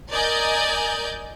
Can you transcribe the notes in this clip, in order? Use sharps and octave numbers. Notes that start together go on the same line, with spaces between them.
A#4 D5 D#5 G#5 G6